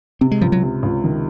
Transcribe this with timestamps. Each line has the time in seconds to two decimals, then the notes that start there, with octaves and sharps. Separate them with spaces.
0.21 C3 C4
0.31 G#3
0.41 C#2 F3
0.52 F#3
0.63 C3
0.83 C#2
1.04 D#3